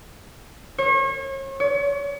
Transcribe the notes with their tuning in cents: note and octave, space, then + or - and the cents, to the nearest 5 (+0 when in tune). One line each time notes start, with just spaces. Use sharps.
C#5 -35
C#5 +40